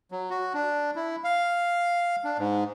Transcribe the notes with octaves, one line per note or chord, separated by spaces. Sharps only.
F#3
F#4
D4
E4
F5
D4
G#2